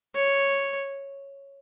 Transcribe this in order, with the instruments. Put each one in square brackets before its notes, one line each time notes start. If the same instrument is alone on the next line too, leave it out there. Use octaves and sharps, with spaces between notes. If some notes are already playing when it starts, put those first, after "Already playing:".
[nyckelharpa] C#5